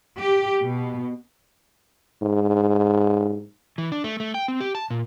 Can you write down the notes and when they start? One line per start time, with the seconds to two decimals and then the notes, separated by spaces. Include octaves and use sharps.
0.18 G4
0.64 B2
2.22 G#2
3.78 E3
3.92 D4
4.04 A3
4.20 A3
4.34 G5
4.48 C4
4.61 G4
4.75 A5
4.90 A#2